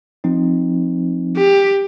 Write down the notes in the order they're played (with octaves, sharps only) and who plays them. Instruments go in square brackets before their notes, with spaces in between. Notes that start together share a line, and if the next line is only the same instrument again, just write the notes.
[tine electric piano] F3 C4 D#4
[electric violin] G4